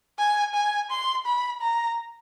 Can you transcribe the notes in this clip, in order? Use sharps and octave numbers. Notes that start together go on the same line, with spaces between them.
G#5
G#5
C6
B5
A#5